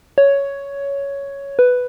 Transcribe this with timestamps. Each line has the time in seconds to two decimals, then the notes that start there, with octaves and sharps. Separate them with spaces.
0.18 C#5
1.59 B4